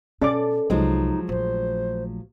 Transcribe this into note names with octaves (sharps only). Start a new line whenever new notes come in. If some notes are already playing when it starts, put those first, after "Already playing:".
B2 C#4 A4 D5 D6
C2 F3 F#3 G#3 D#4
A#1 A3 C5